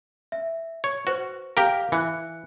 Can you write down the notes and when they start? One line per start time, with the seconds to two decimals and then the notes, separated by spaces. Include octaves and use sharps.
0.32 E5
0.84 C#5
1.07 F#4 B4 C5
1.57 G4 A#4 F5
1.92 E3 F#6 C#7